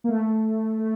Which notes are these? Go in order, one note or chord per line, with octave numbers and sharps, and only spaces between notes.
A#3
A3
A3